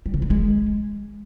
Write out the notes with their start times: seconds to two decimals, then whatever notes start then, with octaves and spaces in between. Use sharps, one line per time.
0.06 G3
0.14 C#3
0.22 G3
0.30 G#3